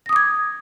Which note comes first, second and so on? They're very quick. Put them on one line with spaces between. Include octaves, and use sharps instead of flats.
A#6 D#6 D6 G#6